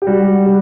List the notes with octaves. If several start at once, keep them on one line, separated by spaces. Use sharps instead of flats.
G4
G3 F#4
G3